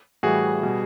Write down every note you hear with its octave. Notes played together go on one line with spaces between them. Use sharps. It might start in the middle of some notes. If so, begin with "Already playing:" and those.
A2 E3 G3 F#4 G#4
B2 G3